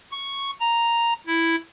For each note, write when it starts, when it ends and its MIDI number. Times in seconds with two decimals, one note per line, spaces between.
0.11 0.51 85
0.60 1.13 82
1.27 1.56 64